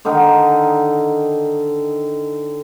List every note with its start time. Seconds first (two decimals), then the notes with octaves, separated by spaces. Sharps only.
0.05 D3 D#3 D#4 A#4